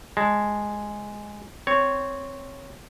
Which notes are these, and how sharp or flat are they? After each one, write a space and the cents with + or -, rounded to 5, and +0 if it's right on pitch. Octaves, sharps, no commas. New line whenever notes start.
G#3 +0 A5 +10
C4 +0 C#5 +0